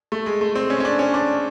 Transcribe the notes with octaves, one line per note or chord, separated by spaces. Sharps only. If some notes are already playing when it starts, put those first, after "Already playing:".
A3
G#3
A3
C4
C#4
C#4
D4
C#4
D4